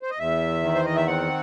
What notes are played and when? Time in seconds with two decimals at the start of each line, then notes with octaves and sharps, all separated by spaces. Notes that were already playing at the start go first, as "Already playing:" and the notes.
0.02 C5
0.11 D#5
0.19 E2 E5
0.63 D#3
0.75 C5
0.85 D#5
0.96 E5
1.07 C4 F#5